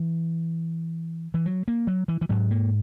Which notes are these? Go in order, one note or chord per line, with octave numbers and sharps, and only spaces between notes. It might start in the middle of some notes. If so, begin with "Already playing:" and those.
Already playing: E3
E3
F#3
A#3
F#3
E3
E3
G#2 F#3
A#3